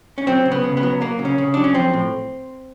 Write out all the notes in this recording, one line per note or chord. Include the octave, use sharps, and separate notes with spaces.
C#4
F#3 C4
C#3
B3
C#3
B3
F#3
F#3 A#3
C#3
C#4
C#3
F#3 D4
C#4
F3 C4
A2